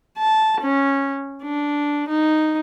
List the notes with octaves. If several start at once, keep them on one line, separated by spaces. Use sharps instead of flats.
A5
C#4
D4
D#4